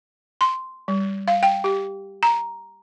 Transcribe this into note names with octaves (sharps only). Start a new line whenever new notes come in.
C6
G3
F5
G5
G4
A#5